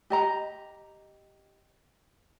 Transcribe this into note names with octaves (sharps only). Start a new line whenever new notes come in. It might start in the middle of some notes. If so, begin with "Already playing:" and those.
G4 D#5 A#5